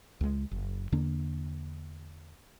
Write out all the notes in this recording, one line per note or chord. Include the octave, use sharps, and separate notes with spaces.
C#2 G#3
F#1
E2 D3 A#3 D4